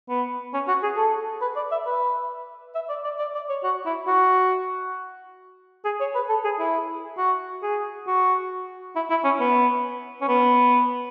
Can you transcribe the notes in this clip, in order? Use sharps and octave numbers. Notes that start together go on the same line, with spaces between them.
B3
C#4
F#4
G#4
A4
B4
D5
E5
B4
E5
D5
D5
D5
D5
C#5
F#4
E4
F#4
G#4
C#5
B4
A4
G#4
E4
F#4
G#4
F#4
E4
E4
C#4
B3
C#4
B3